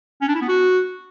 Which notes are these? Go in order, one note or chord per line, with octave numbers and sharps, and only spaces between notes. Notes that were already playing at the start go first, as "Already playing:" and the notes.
C#4
D4
E4
B3
F#4